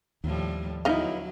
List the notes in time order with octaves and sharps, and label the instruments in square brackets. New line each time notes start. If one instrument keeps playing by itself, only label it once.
[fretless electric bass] D#2 [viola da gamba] A2 F3 G3
[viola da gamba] D3 F#3 [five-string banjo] B3 D#4 E4 [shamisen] D#5 F5